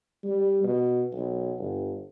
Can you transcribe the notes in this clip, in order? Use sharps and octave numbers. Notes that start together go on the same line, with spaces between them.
G3
B2
B1
G1